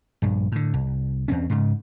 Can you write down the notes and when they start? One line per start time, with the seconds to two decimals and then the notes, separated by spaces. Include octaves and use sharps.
0.22 A#1 G2
0.52 A2 D3
0.74 C2
1.28 E2 C4 C#4
1.50 G#2 C#3